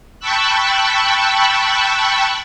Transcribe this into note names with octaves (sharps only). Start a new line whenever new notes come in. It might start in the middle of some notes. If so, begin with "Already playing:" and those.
G5 A5 B5 C#6 E6 F#6